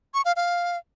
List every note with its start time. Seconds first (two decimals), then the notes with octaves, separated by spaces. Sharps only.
0.14 C#6
0.25 F5
0.36 F5